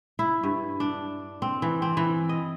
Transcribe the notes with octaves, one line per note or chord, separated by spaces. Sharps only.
E4
G2
D4
C4
E3
C4
E3
D#5